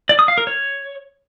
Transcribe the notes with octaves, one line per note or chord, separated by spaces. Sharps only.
D5
D#6
F5
A#4
C#5